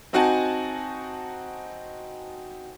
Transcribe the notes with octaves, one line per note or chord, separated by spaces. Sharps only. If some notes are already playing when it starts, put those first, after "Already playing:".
C4 D#4 F#4 F#5 G#5 A5